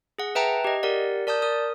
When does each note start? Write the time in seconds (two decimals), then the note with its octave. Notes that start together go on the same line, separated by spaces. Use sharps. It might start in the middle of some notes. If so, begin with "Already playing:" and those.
0.19 G#4 F#5
0.35 B4 E5 G5 A5 A#5
0.64 G4 D#5
0.83 G4 A#4 D5 F#5
1.27 A#4 D5 A5 D#6 G6
1.42 A#4 D#6